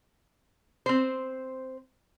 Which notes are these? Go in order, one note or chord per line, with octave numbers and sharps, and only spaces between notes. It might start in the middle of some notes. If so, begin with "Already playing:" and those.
C4 C5